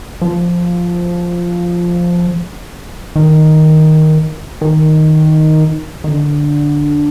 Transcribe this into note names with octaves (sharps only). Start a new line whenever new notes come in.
F3
D#3
D#3
D#3
D3